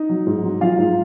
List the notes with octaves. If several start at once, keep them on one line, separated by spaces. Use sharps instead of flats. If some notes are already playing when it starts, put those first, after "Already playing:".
Already playing: D#4
F#3
G#2
F#3
F#3 F4 F5
G#2